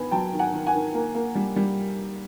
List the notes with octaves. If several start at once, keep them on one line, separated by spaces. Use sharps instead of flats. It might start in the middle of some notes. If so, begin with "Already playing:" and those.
Already playing: D#3 B3 G#5 B5
F#3 G5 A5
D#3
F#5 G#5
D#3
F#5 G#5
D#3
A#3
A#3
G3
G3